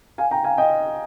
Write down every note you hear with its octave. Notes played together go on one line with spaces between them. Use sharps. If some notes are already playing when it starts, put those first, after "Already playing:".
F5 G#5
G5 A#5
F5 G#5
D#5 G5